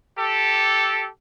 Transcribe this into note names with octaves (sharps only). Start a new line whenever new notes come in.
G4 A4